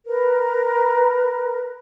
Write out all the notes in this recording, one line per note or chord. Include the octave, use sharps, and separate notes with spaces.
A#4 B4